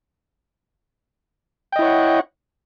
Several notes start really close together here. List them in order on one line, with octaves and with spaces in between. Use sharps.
G5 D#5 E4 C#5 F#5